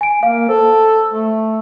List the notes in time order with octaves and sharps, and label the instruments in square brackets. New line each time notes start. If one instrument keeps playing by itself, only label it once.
[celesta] G#5 D7
[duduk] A#3 [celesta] F5
[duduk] A4 [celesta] C5
[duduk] A3